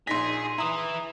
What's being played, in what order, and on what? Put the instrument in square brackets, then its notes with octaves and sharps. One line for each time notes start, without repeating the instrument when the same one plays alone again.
[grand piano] A#1 D#4 A#6 [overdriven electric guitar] G#4 [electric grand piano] C6 B6
[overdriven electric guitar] E4 B4 [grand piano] A#5 D#6